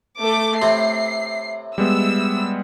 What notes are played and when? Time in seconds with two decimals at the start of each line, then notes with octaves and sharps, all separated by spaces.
0.21 A3 D6
0.62 A2 C3 C4 C7
1.78 G3 G#3 B3 E6